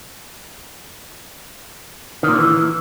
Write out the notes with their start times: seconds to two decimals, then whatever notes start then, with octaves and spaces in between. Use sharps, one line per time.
2.23 D#3
2.28 A#2
2.34 D3
2.39 E3